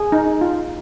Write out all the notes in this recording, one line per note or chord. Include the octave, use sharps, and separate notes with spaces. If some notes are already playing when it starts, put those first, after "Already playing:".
Already playing: G#4
D#4
F4